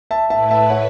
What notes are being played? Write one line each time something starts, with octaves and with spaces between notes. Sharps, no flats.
E5 A5
A2 A3 E4 B4 E5 A5
E5 A5
C#5 F#5